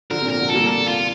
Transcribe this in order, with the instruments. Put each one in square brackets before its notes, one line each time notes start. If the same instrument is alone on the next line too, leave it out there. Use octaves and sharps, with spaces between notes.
[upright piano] D3 F3 [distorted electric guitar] A#4
[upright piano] C3
A#2 D3
[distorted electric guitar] A#4
[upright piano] A#2 D3
[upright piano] G3 A#3 [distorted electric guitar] A4
[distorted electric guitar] A4
F4